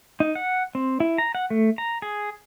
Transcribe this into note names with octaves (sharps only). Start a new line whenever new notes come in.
D#4
F#5
C4
E4
A#5
F#5
A3
A#5
G#4